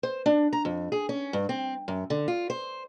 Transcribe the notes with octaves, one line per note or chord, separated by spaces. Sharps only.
C5
D4
A#5
F2
G#4
C#4
G2
C4
F#2
D3
F4
C5